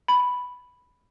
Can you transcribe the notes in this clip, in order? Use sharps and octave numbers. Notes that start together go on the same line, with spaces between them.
B5